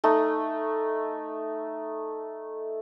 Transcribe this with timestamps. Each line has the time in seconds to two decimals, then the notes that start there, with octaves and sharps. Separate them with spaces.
0.04 A3 D#4